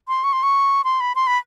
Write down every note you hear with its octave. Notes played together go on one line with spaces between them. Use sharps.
C6
C#6
C6
C#6
C6
B5
C6
B5